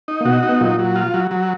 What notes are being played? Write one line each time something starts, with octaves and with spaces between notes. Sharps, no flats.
D#4
A#3
B2 B3 F#4
D#4
B3
A#2 F#3 A#3
F#3
F4
F#3
F#3